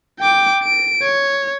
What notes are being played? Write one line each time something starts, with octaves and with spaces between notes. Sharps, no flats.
G5 D6
D7
C#5